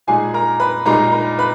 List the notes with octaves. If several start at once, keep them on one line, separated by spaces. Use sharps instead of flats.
A#2 G#3 D#4 G#4 G#5
A#4 A#5
B4 B5
A#2 G#3 D#4 A#4 A#5
A#4 A#5
B4 B5